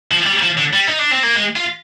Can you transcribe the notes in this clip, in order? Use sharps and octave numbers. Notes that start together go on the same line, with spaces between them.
F3
G3
F3
D3
G3
D#4
D4
C4
A#3
G#3
F4